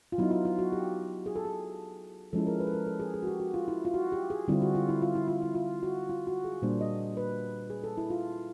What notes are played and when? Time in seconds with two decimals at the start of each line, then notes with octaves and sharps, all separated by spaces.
0.12 F4
0.18 F#3 B3 D#4 E4
0.31 F4
0.45 F4
0.59 F#4
0.72 G4
1.26 G#4
1.36 A4
1.45 G#4
2.33 F3 G#3 C#4 E4 A4
2.47 A#4
2.60 B4
2.67 A4
2.73 A#4
2.87 A4
3.00 G#4
3.14 G#4
3.23 F#4
3.27 G4
3.40 F#4
3.54 F4
3.68 E4
3.85 F4
3.94 F#4
4.12 G4
4.30 G#4
4.48 D3 G3 C4 E4 F4
4.62 F#4
4.75 F4
4.89 E4
5.02 F4
5.15 E4
5.28 F4
5.42 E4
5.55 F4
5.83 F#4
6.10 F4
6.27 F#4
6.45 G#4
6.62 A#2 G3 A#3 D4 C5
6.81 D#5
7.17 B4
7.70 G#4
7.84 A4
7.98 E4
8.10 F4